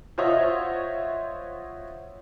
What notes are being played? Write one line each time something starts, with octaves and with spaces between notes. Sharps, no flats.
F4 F#4 C5 C#5 D#5 E5